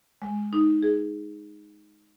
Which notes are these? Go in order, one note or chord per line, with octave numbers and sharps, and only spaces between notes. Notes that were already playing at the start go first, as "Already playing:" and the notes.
G#3
D#4
G#4